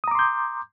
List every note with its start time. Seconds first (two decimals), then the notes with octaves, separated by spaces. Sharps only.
0.04 D#6
0.08 A#5
0.11 D6
0.15 C6
0.19 G6